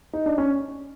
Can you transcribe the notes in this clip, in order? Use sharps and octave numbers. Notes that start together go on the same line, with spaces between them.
D#4
D4
C#4